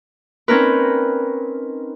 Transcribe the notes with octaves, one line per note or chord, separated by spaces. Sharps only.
C4 C#4 D#4 A#4 B4